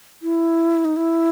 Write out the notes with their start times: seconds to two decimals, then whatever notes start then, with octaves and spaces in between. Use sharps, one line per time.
0.22 E4
0.85 D#4
0.97 E4